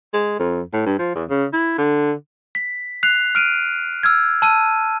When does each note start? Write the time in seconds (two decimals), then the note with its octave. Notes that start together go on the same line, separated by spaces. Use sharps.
0.14 G#3
0.39 F2
0.73 A2
0.86 G2
0.99 F3
1.15 E2
1.30 C#3
1.53 E4
1.78 D3
2.55 B6
3.03 F#6 C7 F7
3.35 F6 D7 D#7
4.03 E6 F6 G#6
4.42 A5 E6 D#7